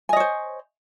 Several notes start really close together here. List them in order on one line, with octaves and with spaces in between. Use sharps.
G#5 D#5 C#5 C5